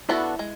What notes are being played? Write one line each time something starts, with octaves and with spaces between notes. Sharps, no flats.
B3 D4 E4 F#4 A4 D5
G#3